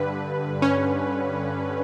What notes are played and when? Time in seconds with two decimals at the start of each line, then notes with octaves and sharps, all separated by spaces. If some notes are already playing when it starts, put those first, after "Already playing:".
Already playing: G2 D3 B4
0.62 C#4